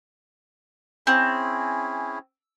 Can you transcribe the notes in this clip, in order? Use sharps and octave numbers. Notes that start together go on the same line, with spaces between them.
C4 C#4 E4 G#4